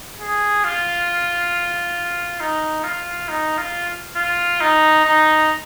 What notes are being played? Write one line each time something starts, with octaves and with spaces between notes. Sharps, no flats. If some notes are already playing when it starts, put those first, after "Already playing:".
G#4
F4
D#4
F4
D#4
F4
F4
D#4
D#4